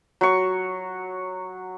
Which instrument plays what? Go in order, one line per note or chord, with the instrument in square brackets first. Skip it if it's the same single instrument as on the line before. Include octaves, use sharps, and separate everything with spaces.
[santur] F#3 C#6